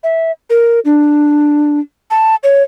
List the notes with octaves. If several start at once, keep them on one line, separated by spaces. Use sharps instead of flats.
E5
A#4
D4
A5
C#5